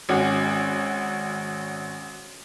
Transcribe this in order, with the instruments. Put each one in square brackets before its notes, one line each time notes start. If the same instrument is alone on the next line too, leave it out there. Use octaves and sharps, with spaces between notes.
[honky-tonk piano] G#1 C#4 F#4